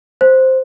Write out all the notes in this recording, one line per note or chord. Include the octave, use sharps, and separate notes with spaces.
C5